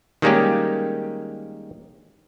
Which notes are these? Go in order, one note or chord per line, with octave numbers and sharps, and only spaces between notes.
D#3 G3 G#3 A#3 C#4 G4